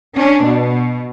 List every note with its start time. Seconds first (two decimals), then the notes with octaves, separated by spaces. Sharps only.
0.15 C#4 D4
0.44 B2